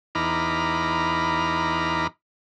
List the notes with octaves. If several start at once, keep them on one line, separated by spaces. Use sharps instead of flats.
E2 D#4 A#5 B5 D6 F6